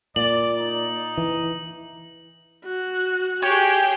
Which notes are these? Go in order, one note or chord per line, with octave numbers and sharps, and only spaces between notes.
A#2 D5 F#7
D#4
E3
F#4
G4 G#4 C#5 G5